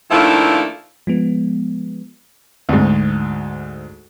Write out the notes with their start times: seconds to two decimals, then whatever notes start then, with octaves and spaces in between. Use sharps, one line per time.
0.11 D#3 F3 A3 A#3 D4 E4
1.07 F3 G#3 B3
2.69 D2 G#2